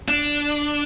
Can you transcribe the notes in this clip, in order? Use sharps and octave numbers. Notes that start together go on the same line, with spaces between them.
D4